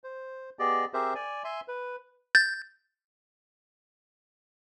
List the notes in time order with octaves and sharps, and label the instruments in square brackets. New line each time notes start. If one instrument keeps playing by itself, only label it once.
[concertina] C5
B3 G4 G#4 D5 D#5
C4 G4 G#4 A#4 C5 E5
D5 G#5
E5 G#5 C6
B4
[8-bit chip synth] G6 A6